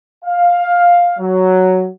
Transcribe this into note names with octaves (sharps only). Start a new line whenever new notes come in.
F5
F#3